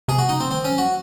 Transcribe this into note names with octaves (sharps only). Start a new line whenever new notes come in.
C3 G#4
F#4
C#3 D#4
C4
D#3 C4
C#4
F#3
F#4